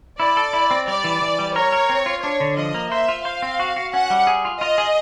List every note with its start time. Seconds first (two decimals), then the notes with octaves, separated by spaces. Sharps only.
0.20 E4 D5
0.37 A4
0.53 E4
0.71 C4
0.87 G3 D5
1.04 E3
1.22 E3
1.39 G3
1.55 A#4 C#5
1.72 A#4
1.89 C4
2.06 F4
2.23 D4 C#5
2.40 D3
2.57 F3 D#5
2.75 A#3
2.91 C5 E5
3.08 F4
3.25 C5 F5
3.42 C4
3.60 F#4
3.77 F#4
3.93 C#4 F#5
4.10 G3
4.27 G#4
4.45 F4
4.61 F4 D#5
4.78 G#4